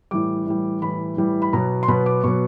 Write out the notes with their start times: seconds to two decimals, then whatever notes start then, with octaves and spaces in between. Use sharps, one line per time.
0.11 A2 E3 G3 D6
0.46 A2 E3 G3
0.82 A2 E3 G3 B5
1.17 A2 E3 G3
1.42 B5
1.53 B2 F#3 B3 A#5
1.83 C6
1.88 B2 F#3 B3 B5
2.06 D6
2.24 B2 F#3 B3 C#6